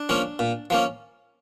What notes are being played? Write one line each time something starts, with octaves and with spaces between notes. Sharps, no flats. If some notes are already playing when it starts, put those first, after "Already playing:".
Already playing: D4
F3 A#3 C#4
A#2
F3 A#3 C#4